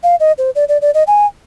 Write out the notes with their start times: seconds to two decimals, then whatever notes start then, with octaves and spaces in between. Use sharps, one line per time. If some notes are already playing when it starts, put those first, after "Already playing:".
0.03 F5
0.20 D#5
0.38 C5
0.55 D5
0.68 D5
0.81 D5
0.94 D#5
1.07 G#5